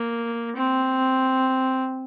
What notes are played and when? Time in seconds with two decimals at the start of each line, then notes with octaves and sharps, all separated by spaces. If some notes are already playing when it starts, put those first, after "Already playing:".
Already playing: A#3
0.55 C4